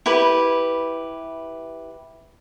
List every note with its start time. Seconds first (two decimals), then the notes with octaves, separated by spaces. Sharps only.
0.06 E4 G4 B4